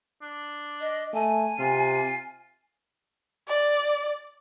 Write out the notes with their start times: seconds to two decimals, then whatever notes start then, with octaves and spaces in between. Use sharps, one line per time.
0.22 D4
0.80 D#5
1.14 A3 G#5
1.59 C3 F4
3.48 D5